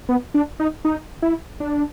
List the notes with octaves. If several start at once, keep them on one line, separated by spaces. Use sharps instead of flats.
B3
D4
D#4
D#4
E4
D4